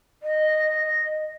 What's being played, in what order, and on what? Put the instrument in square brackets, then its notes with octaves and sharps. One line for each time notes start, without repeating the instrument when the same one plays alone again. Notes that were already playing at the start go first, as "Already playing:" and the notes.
[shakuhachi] D#5